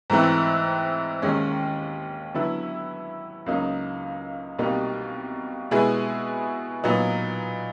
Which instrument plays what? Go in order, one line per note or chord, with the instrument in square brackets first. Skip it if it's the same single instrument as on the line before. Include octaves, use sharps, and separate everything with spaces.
[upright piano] G#2 E3 A3 C4 E4
D#2 D#3 G#3 C#4
D3 F#3 B3 E4
C#2 C#3 F#3 A#3 D#4
C2 B2 G3 A#3 D#4
B2 G#3 B3 E4 G#4
A#2 F#3 B3 D#4